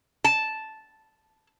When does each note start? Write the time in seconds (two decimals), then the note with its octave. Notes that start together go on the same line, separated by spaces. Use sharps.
0.24 A5